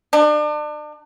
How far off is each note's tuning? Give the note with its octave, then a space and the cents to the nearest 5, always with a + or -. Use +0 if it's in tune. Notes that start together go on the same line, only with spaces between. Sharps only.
D4 +35